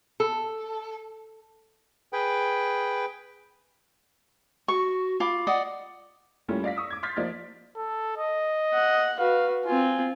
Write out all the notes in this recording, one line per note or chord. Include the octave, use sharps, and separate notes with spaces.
A4
G#4 B4 G5
F#4 C#6
F4 B5 D6
D5 D#5 F#5
G3 A3 A#3 C#4 E4 F4
D5 F5 A#6 B6
C#6 D#6 E6
D6 G#6
C6 F6 G6 A6 B6
F3 A#3 D5 D#5 F6
A4
D#5
F#5
F#4 B4 F5
C4 F4 G#5